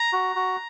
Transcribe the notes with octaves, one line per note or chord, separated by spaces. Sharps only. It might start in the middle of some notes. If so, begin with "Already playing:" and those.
Already playing: A#5
F#4
F#4